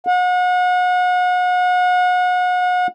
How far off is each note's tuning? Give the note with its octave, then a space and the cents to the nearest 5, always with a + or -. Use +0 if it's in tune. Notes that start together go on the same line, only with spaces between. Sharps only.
F#5 -35